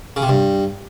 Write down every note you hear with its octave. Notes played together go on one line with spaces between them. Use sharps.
C#3
C3
G2